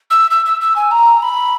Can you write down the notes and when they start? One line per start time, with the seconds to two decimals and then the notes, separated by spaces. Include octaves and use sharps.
0.11 E6
0.31 E6
0.46 E6
0.61 E6
0.76 G#5
0.91 A#5
1.22 B5